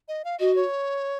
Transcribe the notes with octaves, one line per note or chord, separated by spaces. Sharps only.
D#5
F5
F#4 D#5
C#5